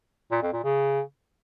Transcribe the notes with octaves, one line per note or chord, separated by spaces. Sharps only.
A#2
F2
A#2
C#3